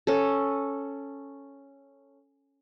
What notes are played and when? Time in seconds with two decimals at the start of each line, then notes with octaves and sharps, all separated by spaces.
0.07 C#4 A4